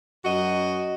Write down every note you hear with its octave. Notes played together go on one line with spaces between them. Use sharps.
F#2 F#4 D#5